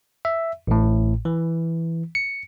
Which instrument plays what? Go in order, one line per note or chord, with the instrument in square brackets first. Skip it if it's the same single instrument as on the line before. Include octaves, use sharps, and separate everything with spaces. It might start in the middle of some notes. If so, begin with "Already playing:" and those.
[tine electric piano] E5
A1 A2
E3
C#7